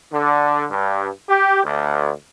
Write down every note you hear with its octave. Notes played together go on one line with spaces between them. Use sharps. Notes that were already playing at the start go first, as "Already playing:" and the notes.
D3
G2
G4
D2